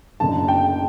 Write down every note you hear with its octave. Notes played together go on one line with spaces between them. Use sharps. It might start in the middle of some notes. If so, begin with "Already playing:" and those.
F#1 F#2 D3 A5
G5